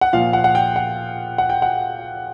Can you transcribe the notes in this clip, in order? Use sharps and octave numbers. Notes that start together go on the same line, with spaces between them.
F#5
A#2 F3 F5
F#5
F#5
G5
F#5
F#5
G5
F#5